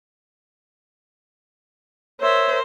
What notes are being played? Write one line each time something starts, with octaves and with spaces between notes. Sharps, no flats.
A#4 C5 C#5 E5 E6